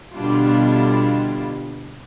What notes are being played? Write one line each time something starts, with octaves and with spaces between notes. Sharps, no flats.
B2 D3 G3 D4 E4 F4